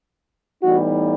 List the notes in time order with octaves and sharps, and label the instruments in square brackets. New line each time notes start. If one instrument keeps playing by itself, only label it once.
[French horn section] A2 E3 G3 B3 D#4 F#4